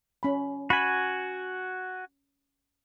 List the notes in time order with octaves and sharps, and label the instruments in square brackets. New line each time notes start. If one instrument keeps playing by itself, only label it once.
[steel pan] C#4 B5
[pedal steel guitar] F#4 G#5 [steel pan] B5